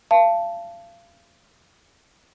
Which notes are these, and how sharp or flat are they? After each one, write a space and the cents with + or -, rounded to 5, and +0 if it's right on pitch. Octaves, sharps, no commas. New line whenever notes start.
F5 -30 A5 +0